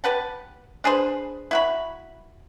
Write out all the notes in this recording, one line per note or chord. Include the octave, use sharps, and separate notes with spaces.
G4 B4 F#5 A5
D4 G#4 B4 C5
E4 F#4 B5